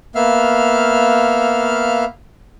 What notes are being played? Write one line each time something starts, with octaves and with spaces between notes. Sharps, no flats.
A#3 B3 E5 F5 F6